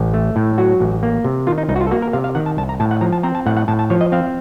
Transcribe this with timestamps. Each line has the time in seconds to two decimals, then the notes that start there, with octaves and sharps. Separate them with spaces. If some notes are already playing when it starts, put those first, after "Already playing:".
Already playing: A1
0.14 A3
0.36 A2
0.58 F#3 F#4
0.80 A1
1.03 A#3
1.24 C3
1.47 D#3 F4
1.58 D#4
1.69 C2 D#4
1.76 F#4
1.81 F4
1.87 A4
1.91 A#3 F#4
2.02 A#4
2.13 C3 F5
2.24 F5
2.35 D#3 F#5
2.46 A5
2.57 C2 A5
2.69 A#5
2.80 A2 A5
2.91 F#5
3.01 F3 A#5
3.12 A5
3.23 C4 A#5
3.35 A5
3.46 A2 F#5
3.57 F#5
3.68 A2 A5
3.79 A5
3.90 F3 C#5
4.01 D#5
4.12 C4 F5